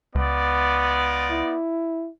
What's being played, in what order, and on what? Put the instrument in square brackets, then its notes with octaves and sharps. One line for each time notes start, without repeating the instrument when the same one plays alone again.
[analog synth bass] C#2 [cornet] B3 [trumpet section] D#4 F4 D5
[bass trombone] E4